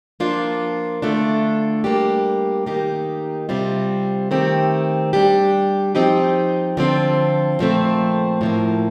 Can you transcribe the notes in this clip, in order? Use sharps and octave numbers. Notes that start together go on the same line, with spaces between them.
F3 A#3 D4 F4
D3 A3 D4 F4
G3 A#3 D4 G4
D#3 A#3 D#4 G4
C3 G3 C4 F4
D#3 A3 C4 G4
G3 D4 G4
F3 C4 D#4 G4
D3 F3 C4 F4
A#2 F3 A3 C4
A2 F3 A#3